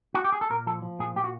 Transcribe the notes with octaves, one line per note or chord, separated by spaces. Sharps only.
F#4
G4
G#4
A4
A#2 A#4
F3 A4
F3
A#2 G#4
A#2 G4
F#4